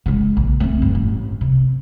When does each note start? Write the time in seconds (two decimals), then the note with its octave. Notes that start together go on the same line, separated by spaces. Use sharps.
0.06 C#3 G#3
0.37 A#1
0.60 A3 C4
0.82 G2
0.95 A1
1.41 C3